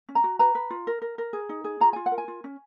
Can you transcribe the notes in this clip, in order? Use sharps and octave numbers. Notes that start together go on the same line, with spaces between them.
C#4
A#5
F#4
B4 A#5
B4
F4
A#4
A#4
A#4
G#4
D#4
G#4
F4 A#5
F4 G#5
F#5
A#4
G#5
F4
C#4